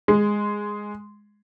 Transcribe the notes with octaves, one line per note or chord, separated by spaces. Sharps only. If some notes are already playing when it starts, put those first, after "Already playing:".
G#3